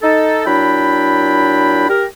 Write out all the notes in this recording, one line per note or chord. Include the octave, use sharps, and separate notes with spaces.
D#4 A4
A#2 F#3 D4 E4 G5 B5
G4 A#4